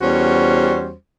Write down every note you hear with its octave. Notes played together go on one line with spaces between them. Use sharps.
E2 G3 C#4 F#4 C5